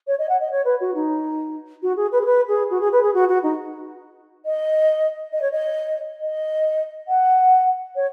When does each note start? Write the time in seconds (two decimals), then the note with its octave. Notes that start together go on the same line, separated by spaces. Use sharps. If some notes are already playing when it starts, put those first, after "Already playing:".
0.07 C#5
0.19 D#5
0.29 F#5
0.40 D#5
0.51 C#5
0.65 B4
0.80 F#4
0.95 D#4
1.82 F#4
1.96 G#4
2.12 B4
2.21 G#4
2.25 B4
2.48 G#4
2.70 F#4
2.80 G#4
2.92 B4
3.03 G#4
3.14 F#4
3.28 F#4
3.43 D#4
4.45 D#5
5.32 D#5
5.42 C#5
5.51 D#5
6.21 D#5
7.08 F#5
7.95 C#5